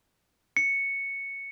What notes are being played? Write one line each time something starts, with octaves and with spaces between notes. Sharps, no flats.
C#7